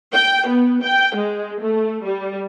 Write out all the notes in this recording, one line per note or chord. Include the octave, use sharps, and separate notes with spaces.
G5
B3
G5
G#3
A3
G3